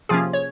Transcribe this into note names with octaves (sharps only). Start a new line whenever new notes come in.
C3 F3 A#3 C#4 F4 G#4
C#5